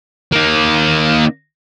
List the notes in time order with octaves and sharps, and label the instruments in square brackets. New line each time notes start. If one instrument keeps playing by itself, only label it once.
[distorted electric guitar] A#3 D#4